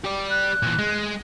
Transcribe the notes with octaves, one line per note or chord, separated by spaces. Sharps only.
G4 D5
F#6
A#2 E3
G#3